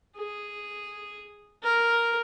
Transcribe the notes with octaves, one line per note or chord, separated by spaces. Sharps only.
G#4
A#4